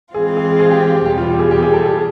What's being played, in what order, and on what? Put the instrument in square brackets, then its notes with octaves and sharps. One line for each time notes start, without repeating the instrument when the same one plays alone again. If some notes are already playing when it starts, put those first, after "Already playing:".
[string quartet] E3 G#3 C4 F4 [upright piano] G#4
[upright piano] G#4
G#4
G4
G4
[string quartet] E2 B2 G3 [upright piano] G4
[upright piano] F4
G4
G#4
G4
G#4
A4
G#4